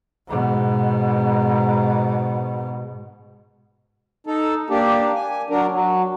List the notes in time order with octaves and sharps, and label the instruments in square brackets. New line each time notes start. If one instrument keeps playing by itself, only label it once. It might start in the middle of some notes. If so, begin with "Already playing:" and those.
[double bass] G#2 B2
[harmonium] D#4 A4
A#3 D4 G4
G#5
F#3 D4 A#4
F#3